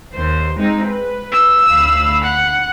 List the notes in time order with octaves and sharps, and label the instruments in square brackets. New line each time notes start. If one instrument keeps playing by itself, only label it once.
[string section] D#2 C5
G#3 C4 D#4
B4
[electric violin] E6
[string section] D2 F5 B5
[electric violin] F#5